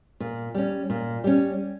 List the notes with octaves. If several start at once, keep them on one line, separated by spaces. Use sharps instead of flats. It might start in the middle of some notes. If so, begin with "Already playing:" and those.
A#2
G3 C#4
A#2
G3 C#4